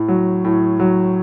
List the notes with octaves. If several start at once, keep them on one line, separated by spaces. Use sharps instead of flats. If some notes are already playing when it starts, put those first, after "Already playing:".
Already playing: A2
F#3
A2
F#3